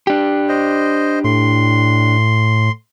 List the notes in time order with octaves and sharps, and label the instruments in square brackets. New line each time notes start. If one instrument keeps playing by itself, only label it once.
[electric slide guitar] D4 G4
[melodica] C5 D#5
[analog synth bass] A2 [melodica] C6